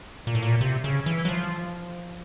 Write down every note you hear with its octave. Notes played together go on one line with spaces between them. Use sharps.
A#2
A2
A#2
C3
C#3
E3
F#3
F3